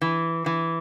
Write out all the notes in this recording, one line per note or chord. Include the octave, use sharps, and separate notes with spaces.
E3
E3